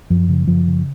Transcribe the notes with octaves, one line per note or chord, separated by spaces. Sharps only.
F#2 F3
C#3
F#2 F3
C#3